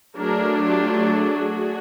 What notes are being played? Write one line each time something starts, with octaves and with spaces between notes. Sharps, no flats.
F#3 A3 D4 G#4 A#4
F4 G4
F#4 G#4